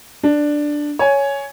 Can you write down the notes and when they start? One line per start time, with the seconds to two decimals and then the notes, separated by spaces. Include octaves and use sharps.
0.23 D4
0.99 C#5 G#5